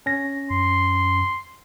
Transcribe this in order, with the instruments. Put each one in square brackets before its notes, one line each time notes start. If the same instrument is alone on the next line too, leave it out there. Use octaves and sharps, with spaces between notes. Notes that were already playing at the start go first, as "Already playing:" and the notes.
[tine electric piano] C#4 A#6
[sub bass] F#2 [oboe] C6